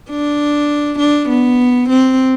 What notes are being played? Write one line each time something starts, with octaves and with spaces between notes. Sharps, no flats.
D4
D4
B3
C4